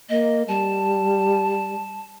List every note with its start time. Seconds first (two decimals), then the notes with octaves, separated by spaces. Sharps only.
0.10 A#3 D#5
0.48 G3 A5